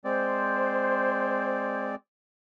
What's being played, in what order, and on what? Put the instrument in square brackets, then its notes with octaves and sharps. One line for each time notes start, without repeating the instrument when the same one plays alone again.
[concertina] G#3 C4 D5 [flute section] C5